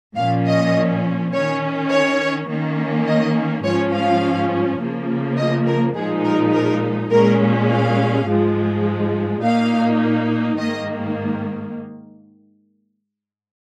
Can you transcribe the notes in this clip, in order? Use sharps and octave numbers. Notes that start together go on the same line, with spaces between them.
A#2 F3 C#4 F5
D#5
D#3 C#4 C#5
C#5
D#3 A#3 C#4
D#5
G#2 F3 C#4 C#5
F5
C#3 F3 A#3
D#5
A#4
A#2 F3 G#3 D#4 G#4
A#4
A#4
A#2 G#3 C#4 A#4
F5
G#2 F3 G#3
A#2 A#3 D#4 F5
G#2 D#3 A#3 D#5